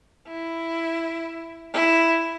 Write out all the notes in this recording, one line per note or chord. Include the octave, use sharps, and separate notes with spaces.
E4
E4